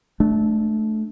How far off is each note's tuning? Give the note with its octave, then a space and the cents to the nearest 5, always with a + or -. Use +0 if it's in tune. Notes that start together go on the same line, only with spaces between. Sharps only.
A3 -20 D4 +10